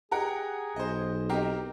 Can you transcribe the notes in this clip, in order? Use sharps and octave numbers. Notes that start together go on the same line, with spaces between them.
G4 G#4 A#4 F#5
B1 C5 D#5
C4 D#4 G4 A#4